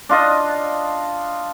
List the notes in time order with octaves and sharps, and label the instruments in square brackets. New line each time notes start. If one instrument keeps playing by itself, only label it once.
[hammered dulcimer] D4 F4 D#5